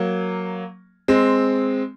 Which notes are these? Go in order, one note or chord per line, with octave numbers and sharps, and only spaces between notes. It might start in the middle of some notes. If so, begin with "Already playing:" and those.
Already playing: F#3 A#3
G#3 C4